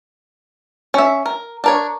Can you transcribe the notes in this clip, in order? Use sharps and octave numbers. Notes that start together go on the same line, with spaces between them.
C#4 E5
A#4
D4 A#4 C#5